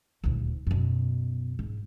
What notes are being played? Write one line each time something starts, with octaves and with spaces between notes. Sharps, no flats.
D#1 D2
F#2 B2
G#2